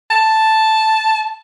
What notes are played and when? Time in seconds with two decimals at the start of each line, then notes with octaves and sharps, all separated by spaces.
0.10 A5